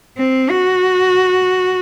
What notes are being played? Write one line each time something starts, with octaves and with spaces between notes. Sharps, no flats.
C4
F#4